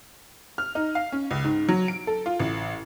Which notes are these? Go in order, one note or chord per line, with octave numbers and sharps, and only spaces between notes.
F6
D#4
F5
C#4
C#2
G#2
F#3
D7
A4
F4
A1